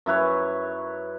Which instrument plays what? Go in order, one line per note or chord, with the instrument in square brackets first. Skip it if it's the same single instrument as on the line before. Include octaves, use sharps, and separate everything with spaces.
[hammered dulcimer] F#2 E4 B4 C#5